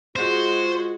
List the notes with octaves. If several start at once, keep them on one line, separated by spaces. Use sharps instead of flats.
G#3 F4 F#4 C5